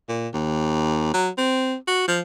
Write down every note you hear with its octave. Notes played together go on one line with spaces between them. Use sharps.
A#2
D#2
F#3
C4
F#4
F3